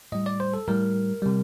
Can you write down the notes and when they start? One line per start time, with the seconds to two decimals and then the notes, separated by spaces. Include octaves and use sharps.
0.12 A2 G3 D#5
0.26 D5
0.40 C5
0.54 A4
0.67 A2 G3 A#4
1.22 C3 G3